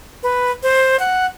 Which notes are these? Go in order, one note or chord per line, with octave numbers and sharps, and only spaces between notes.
B4
C5
F#5